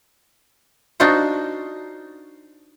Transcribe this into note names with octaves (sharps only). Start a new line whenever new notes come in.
D4 D#4 F4 F#4 C5